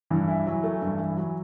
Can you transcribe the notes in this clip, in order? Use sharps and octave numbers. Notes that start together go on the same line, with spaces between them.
G2 E3
E4
F#3
A3
G2
E4
F#3